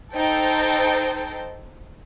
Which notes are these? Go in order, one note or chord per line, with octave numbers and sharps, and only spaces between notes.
D#4 A4 C5 G5